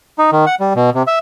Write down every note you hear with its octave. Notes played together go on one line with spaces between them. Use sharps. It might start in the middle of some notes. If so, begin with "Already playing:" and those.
D#4
D#3
F#5
G3
B2
C3
E5